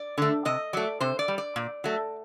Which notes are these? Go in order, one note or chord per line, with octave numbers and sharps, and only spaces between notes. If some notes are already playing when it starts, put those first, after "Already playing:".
Already playing: D5
D3 A3
C3 D#5
F#3 A3 D5
C3 C5
D5
G3
D5
A#2
F#3 A3